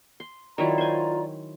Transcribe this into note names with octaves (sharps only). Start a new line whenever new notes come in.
C6
D#3 F#3 E4 F4 D5 A#5
C5 G#5